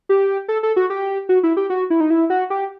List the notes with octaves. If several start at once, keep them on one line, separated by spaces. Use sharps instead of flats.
G4
A4
A4
F#4
G4
F#4
E4
G4
F#4
E4
D#4
E4
F#4
G4